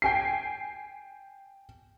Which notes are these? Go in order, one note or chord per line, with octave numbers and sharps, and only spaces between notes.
G5 G#5 C7